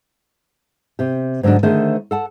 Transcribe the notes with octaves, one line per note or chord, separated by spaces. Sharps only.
C3 G4
G#2 D3 F#3 G#3 D4
D3 D#3 A3 G#4 C5
A4 F#5 A5